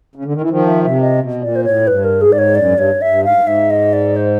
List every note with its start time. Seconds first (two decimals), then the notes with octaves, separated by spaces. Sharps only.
0.15 C#3
0.25 D3
0.33 D#3
0.41 E3
0.50 D#3 F3
0.67 E5
0.84 C3 E5
1.01 D#5
1.19 B2
1.41 A#2 D5
1.56 C5
1.64 A2 C#5
1.87 G2 B4
2.04 A#4
2.21 G#2 G#4
2.32 D5
2.39 C#5
2.55 F#2 D5
2.64 G#2
2.73 G2
2.78 C#5
3.02 E5
3.07 G2
3.24 G#2 F5
3.33 G2
3.41 G#2
3.47 E5
3.70 D#5
3.93 D5
4.16 C5